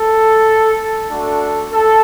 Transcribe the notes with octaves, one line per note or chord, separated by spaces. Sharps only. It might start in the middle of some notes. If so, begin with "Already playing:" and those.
Already playing: A4
A3 D4 F#4 A4
A4